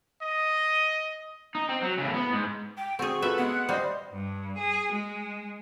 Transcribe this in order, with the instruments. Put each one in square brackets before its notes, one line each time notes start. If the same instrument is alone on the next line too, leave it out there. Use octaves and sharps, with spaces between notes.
[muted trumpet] D#5
[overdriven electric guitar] D#4
C4
F#3
A2 C#3
B3
G#2
[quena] G5
[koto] C4 G#4 [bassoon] F#4 [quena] C#6
[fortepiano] A3 F4 B4 [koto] E5
[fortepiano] G#3 B3 [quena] F#5
[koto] G3 [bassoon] C5 [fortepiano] D#5 F5
[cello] G2
G#4
G#3